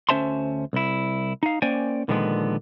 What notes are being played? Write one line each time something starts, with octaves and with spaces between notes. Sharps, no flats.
D2 C#4 C5 E5 A5 C6
C2 E4
D#4 F5
A#3 C#4 C5 D5 G5 G#5
A#2 D3 D#3 F3 G#3 B3